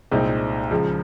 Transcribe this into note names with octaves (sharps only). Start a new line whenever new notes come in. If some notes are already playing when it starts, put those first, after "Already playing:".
C2 A#2 G#3 C4 D#4
C#2 C#3 F3